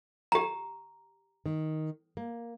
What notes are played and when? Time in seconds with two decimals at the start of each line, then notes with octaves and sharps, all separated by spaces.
0.32 G4 A#5
1.46 D#3
2.17 A#3